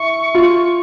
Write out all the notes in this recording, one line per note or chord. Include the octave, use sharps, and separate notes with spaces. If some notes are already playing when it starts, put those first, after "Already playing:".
Already playing: E4 C#6
F4